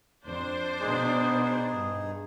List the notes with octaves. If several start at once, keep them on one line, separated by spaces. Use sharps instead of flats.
F2 D4 C5
B2 B3 D#4 G#4
G2